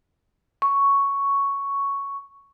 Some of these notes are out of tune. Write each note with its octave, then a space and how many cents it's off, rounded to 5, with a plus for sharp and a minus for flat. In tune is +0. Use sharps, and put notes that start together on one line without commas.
C#6 +5